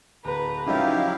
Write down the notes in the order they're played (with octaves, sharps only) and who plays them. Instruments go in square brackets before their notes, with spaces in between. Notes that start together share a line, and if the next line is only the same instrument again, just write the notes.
[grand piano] D1 [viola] B4 A#5
[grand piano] C#3 F3 [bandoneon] F#3 E4 G4 [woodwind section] D#4 [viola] F5